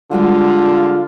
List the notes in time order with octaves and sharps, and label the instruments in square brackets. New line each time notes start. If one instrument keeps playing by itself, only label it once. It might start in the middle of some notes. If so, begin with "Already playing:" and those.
[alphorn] D3 [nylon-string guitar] G3 G#3 F#4 [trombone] F4